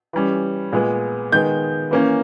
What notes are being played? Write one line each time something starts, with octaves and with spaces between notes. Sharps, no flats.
E3 G3 C#4
A#2 G#3 B3
D#3 G#3 B3 G6
E3 A#3 C#4